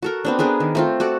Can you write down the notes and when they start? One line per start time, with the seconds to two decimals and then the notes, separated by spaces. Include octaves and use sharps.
0.02 F#4 A4 A#4
0.25 B3 C4 D4
0.39 B3 D4 G#4 A#4
0.60 D#3
0.75 A3 C4 F4
1.00 F#4 A4 D5